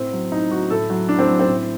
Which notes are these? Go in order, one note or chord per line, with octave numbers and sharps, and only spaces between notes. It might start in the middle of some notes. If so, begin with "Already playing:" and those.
Already playing: A2 C4
F#3
A2 D#4
F#3 F#4
A2 A4
F#3
A2 D4
C4
F#3
C4
A2